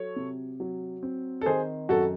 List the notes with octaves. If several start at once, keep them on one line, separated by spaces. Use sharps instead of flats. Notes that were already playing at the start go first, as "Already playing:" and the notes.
Already playing: F#3 A4 C#5
C3
F#3
C4
A4
D#3 G#4 C5
F#2 F#4 A4